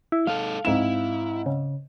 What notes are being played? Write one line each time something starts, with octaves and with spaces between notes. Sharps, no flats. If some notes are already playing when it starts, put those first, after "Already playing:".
E4
G#3 D#4 A4 F5
G#2 C4 E4 E7
C#3